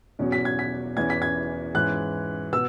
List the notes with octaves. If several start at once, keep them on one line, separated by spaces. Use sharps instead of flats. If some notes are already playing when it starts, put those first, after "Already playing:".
E2 B2 F#3 C#4
B6
G#6
B6
E2 E3 C#4 G#6
B6
G#6
G#2 E3 C#4 F#6
B2 B3 E6